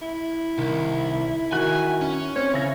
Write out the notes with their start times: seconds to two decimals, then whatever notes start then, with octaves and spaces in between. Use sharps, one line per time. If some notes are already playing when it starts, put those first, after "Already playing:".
0.02 E4
0.58 C2 D#3
1.52 D#3 F#4 G#5 F#6
2.01 C#4
2.36 C4 C#5
2.53 C#3 E4 A#6